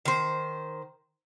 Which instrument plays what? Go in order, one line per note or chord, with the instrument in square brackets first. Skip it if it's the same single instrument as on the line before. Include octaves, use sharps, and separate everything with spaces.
[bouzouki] D#3 C5